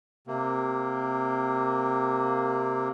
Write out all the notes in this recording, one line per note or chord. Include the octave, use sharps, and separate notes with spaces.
C3 A#3